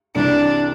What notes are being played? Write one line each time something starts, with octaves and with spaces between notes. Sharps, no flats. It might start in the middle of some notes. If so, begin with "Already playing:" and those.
C2 C3 E3 D4